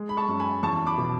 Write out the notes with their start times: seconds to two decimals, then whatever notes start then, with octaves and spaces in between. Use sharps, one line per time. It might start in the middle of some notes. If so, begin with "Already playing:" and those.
Already playing: G#3
0.09 B5
0.17 A5 C#6
0.29 F#2
0.40 G#5 B5
0.63 E2 A5 C#6
0.86 B5 D6
0.98 B2